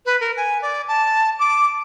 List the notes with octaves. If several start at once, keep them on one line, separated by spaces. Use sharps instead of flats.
B4
A#4
G#5
D5
A5
D6